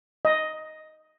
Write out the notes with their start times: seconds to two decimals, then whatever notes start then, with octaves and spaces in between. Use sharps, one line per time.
0.25 D#5